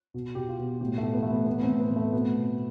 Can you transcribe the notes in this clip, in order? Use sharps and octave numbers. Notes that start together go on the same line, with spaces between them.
B2
B2 G4
F4
B2
A2 G4
A3
A2
B3
E3 A3
B3
A2 B3
C4
A2
B3
A2 A3
B2 B3
B2